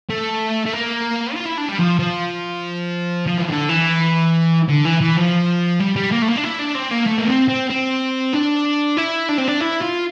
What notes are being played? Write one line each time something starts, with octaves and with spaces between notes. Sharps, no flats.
A3
A3
A#3
F4
E4
D4
G3
F3
F3
F3
E3
D3
E3
D3
E3
E3
F3
G3
G3
A#3
A3
A#3
D4
E4
D4
C4
A#3
A3
A#3
C4
C4
C4
D4
E4
D4
C4
D4
E4
F4